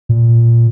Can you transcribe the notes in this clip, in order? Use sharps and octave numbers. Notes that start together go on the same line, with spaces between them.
A#2